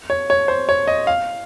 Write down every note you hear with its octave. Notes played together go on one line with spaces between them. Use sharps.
C#5
C#5
C5
C#5
D#5
F5